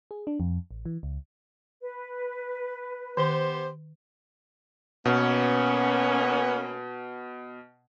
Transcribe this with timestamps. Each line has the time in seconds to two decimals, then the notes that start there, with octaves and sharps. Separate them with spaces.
0.11 G#4
0.27 D4
0.40 F2
0.71 A1
0.85 E3
1.03 C#2
1.81 B4
3.17 D#3 B3 G4 C5
5.05 B2 A#3 B3 C#4